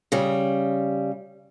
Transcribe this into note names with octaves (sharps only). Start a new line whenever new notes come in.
C#3 G3